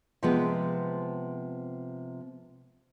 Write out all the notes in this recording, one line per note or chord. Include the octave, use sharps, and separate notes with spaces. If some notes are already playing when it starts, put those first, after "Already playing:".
C3 F3 G#3 B3